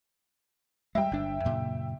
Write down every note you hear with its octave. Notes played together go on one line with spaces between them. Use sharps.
G3 G#3 E5 G5
G1 D4
F#2 A#2 C#3